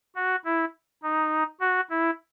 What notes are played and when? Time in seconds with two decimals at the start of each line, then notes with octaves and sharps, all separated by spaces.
0.15 F#4
0.44 E4
1.03 D#4
1.60 F#4
1.90 E4